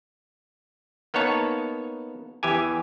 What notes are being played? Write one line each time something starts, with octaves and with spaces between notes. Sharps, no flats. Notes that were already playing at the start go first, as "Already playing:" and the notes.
A#3 B3 D#4 C#5 A5
E2 E3 G4 G#5